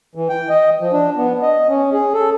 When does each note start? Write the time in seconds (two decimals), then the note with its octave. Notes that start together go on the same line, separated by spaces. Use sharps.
0.15 E3
0.29 G5
0.49 D#5
0.80 F3
0.93 D4
1.17 B3
1.42 D#5
1.69 C#4
1.93 G#4
2.14 A4